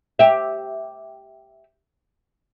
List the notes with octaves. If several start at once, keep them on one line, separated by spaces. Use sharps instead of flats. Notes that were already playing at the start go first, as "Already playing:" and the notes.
G4 E5